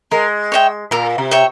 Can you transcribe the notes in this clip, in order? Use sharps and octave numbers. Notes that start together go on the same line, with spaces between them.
G#3 A#4
C#5 E5 G5
A#2 A#4
C3
C#5 E5 G5